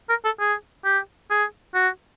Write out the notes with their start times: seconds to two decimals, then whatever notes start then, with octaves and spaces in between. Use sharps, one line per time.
0.09 A#4
0.25 A4
0.40 G#4
0.85 G4
1.30 G#4
1.75 F#4